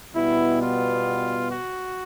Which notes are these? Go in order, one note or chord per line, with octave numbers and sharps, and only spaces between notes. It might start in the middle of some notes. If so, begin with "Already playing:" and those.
B2 G3 B3 E4
F4
F#4